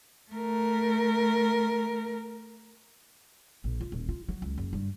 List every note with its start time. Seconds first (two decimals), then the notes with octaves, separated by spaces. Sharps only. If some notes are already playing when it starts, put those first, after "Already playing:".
0.31 A3 A#4
3.64 A#1
3.81 F4
3.92 D#1
4.09 F4
4.28 F#3
4.42 C#2
4.58 F#1
4.73 G2